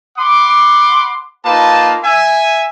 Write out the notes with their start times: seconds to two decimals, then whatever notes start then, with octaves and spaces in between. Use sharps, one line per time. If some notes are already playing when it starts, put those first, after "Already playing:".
0.19 F#5 B5 C6 D6
1.45 A#3 D#4 F4 B4 A5
2.04 E5 G#5